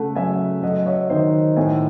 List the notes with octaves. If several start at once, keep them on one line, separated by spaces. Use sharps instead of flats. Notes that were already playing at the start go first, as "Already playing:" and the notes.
Already playing: C#3 A3 F#5
F#3 E5 G#5
F#3 D#5 F#5
C#5 E5
D#3 C5 D#5
A2 E5 G#5